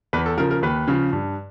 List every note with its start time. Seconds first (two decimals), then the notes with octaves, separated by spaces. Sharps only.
0.13 E2 B4
0.26 A4
0.37 C#3 F3 A#4
0.50 A#4
0.62 D#2 B4
0.88 C#3 F3
1.13 G2